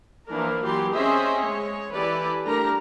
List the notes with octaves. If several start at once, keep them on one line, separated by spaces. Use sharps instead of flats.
E3 F3 A#3 D4 A#4
E3 F#3 G4 C6
C4 C#4 G#4 C5 D#5 E5
G#3 C#5
E3 E4 G4 A4 B4 D5
G3 A3 D4 G4 A#4 A#5